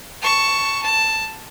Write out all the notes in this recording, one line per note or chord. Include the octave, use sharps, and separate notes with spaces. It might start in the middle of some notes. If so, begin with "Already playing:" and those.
A5 C#6
A5